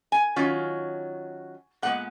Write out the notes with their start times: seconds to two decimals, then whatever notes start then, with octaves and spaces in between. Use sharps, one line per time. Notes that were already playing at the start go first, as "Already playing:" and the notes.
0.12 G#5
0.36 D#3 F#3 C#4 F4
1.82 A#2 G#3 B3 F#5